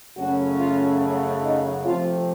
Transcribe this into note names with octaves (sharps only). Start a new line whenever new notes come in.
F#2 C#3 F#3 A3 C#4 F#4
F4
C#4
D#4
C3 F3 A3 C4 F4